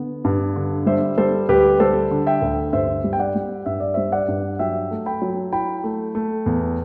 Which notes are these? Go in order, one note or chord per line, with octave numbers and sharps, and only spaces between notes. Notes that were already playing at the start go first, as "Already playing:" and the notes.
Already playing: D3 B3
G2
D3
G3 C5 E5
G3 A4 C5
D2 G4 B4
G3 A4 C5
D3
E5 G5
D2
G2 C5 E5
G3
G5
D5 F#5
G3
G2 E5
D5
G3 C5 E5
D5 F#5
G2
F#3 E5 G5
A3
G5 B5
F#3
E4 G5 B5
A3
A3
E2